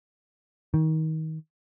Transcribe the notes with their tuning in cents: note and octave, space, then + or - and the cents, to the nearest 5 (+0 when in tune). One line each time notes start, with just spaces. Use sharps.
D#3 +25